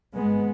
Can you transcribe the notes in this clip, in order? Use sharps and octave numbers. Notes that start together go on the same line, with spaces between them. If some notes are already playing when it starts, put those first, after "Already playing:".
G#1 G#2 G#3 B3